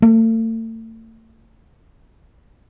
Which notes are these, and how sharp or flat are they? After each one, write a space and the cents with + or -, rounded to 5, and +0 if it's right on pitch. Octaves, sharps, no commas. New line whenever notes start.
A3 +40